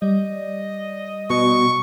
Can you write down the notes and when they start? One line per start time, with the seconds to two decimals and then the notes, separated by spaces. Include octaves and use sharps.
0.02 G3 D5 D#5
1.30 B2 C#6